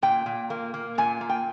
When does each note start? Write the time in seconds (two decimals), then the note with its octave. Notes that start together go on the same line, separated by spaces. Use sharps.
0.02 A#2 G5
0.26 A#2
0.50 A#3
0.74 A#3
0.98 A#2 G#5
1.21 A#3
1.29 G5